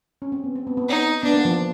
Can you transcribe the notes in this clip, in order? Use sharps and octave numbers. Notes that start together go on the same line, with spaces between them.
C#4
C4
B3
C4
B3
B3
D#4
B3 D4
A#3
F3